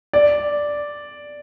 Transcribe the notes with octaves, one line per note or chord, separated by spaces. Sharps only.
D5